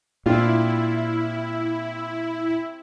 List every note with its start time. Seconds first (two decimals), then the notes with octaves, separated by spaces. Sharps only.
0.26 A#2 C4 D4 E4 F4 G4 F5